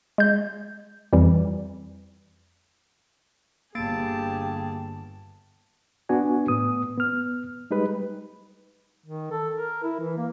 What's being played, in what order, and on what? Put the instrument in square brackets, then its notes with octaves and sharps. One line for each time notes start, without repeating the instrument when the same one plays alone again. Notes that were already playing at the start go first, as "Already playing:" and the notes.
[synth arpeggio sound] G#3 G6
F2 E3 G3
[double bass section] G1 [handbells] A#3 A6 D7 [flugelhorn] G4 [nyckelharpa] G#4 A5
[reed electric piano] B3 D4 F#4 G#5
A2 B3 D#6
B3 F6
G3 G#3 D#4 G4 B4
[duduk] D#3
A4
A#4
E4
E3
A#3